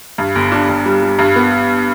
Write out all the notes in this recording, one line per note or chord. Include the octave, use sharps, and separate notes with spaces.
G2
G1
D4
G1
G3
G3
G2
B3